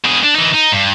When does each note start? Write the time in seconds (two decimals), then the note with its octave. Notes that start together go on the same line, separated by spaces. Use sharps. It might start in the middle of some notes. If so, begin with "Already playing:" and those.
0.04 B2 G#4
0.24 D4
0.35 E3 D#4
0.54 D#4
0.72 G2